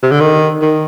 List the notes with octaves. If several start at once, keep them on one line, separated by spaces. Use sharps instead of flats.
C3
D3
D#3
D#3